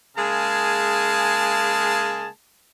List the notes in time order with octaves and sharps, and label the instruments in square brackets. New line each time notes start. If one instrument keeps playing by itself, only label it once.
[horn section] C#3 G#3 A#3 G#4 G#5 A5